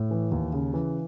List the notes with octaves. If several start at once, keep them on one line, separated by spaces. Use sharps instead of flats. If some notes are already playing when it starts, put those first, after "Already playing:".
Already playing: A2
E3
D#2
C#3
E3